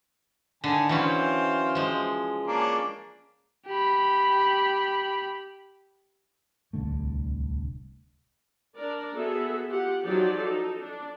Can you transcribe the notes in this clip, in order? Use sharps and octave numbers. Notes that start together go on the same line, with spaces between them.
D3 D#3 G#5 A5
E3 F#3 C#4 C5 F5 G5
F3 G#3
A#3 C#4 D4
G4 B5
D1 C2 D3 A3
D4 A#4 D5
B3 F#4 G#4 A4 E5
F4 G4 F#5
F3 F#3 D#4 G4 D5
D#4 A4
D4